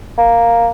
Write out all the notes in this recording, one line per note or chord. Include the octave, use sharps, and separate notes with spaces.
A#3